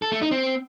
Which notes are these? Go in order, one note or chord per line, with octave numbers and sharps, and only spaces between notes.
A4
A3
D#4
C4